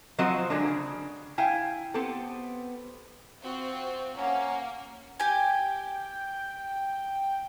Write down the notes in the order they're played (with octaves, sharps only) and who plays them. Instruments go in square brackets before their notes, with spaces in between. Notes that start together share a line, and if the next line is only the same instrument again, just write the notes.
[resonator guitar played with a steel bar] F3 F#3 C4 F#4 C5 D#5
D3 F#3 G#3 A#3 D4
C#3
E4 F5 G5 G#5
B3 C4 G4 A4
[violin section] C4 F4 F#4
[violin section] A#3 [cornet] C#4 [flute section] F#5
[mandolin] G4 G#5 [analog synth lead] G5